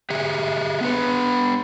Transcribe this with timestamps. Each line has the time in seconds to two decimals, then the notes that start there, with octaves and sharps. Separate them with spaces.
0.10 G4 G#4 E5
0.81 B3 D4 B4